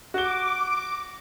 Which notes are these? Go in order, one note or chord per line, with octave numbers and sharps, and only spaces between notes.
F#4 D6 G7